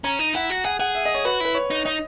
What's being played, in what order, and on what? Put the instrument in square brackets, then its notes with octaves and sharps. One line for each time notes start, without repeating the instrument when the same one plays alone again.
[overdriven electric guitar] C#4 [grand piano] A#5
[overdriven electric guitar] D#4
[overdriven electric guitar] E4 [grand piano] F#5
[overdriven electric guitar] F#4
[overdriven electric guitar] G#4 [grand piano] F#5
[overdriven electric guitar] G#4 [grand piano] F#5
[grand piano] E5
D#5
C#5
[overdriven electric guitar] F#4 [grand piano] B4
[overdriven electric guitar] E4 [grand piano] B4
[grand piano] C#5
[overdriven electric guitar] D#4
[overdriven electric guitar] D#4 [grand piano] D#5